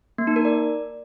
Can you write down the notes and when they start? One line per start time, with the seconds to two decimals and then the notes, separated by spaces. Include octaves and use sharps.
0.18 A#3
0.27 D#4
0.36 A#4
0.45 D5